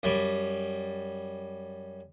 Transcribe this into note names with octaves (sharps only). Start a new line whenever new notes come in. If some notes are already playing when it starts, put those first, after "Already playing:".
F#2 G3